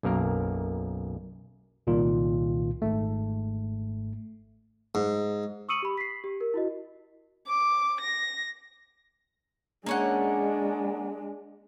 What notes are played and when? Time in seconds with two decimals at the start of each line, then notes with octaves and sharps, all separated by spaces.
0.03 B1 F#2 A#3 A#4
1.87 C2 A#2 D#3 F4
2.82 G#1 G#2 A3
4.95 G#2
5.69 C#6 D#6 E6 C#7 D#7 F#7
5.82 G4 B5
5.98 B6 C7
6.24 G4
6.41 A#4
6.54 E4 F#4 D#5
7.48 D6
8.01 A#6
9.86 G#3 A#3 C#4 D4 F#5